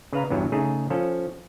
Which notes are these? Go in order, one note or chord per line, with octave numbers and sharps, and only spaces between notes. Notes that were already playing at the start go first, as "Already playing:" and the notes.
C#3 B4 F5 A#5
B1 E2 G2 F#3
C#3 A3 D#4 G#4
F3 C#4 A4